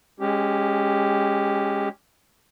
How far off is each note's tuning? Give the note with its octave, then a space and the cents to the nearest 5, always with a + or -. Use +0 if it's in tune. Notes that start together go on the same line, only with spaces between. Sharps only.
G#3 -15 C#4 +0 G4 +0